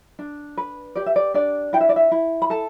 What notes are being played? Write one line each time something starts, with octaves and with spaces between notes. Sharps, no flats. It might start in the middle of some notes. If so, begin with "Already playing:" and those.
D4
B4
G4 D5
E5
D5
D4 D5
E4 G5
E5
D5
E5
E4
B5
A4 A5